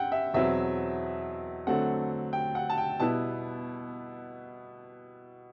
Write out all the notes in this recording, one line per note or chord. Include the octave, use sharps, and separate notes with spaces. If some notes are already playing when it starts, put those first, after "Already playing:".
Already playing: F#2 F#5 G5
E5
E2 B2 F#3 C4 E4 E5
D3 F#3 A3 C4 F#5
G5
F#5
A5
G5
B2 G3 B3 E4 A5